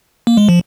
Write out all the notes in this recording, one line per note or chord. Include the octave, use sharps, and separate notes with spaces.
A#3
G#3
F3